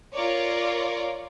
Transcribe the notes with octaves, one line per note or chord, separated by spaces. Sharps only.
F4 A#4 C#5 D5